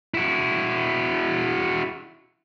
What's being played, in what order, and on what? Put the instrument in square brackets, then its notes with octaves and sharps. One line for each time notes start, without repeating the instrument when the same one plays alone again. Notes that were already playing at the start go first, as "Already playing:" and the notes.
[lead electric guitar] E4 F#4